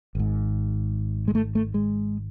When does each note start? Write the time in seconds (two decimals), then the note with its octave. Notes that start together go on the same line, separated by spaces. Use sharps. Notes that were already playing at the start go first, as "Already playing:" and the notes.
0.15 G#1 G#2
1.28 G#3
1.35 A3
1.55 A3
1.74 G#3